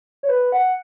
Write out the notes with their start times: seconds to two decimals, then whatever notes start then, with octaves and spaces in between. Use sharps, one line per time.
0.23 C#5
0.29 B4
0.52 F#5